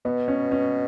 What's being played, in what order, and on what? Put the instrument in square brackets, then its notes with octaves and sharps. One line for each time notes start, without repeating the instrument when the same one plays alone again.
[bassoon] B2 [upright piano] B3
[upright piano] C#4
C#4